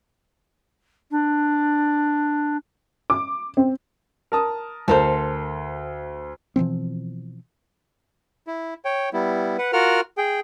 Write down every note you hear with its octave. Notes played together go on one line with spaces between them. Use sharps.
D4
D6
C4
A#4 A5 D#6
D2 A4 A#4 C5
B2 E3 F3 C4
E4
C#5 G5
G3 B3 E4
B4 F#5
F4 F#4 A#4 F#5 F6
G#4 G5